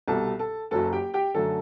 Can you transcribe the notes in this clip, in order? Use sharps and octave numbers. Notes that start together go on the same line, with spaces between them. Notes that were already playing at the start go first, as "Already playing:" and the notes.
C2 B2 G3 A4 A5
A4 A5
F#1 F#2 F#3 A4 A5
G4 G5
G4 G5
F#2 D3 F#3 A3 A4 A5